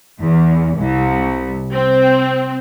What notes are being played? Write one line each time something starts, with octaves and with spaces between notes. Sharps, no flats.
E2
C2
C4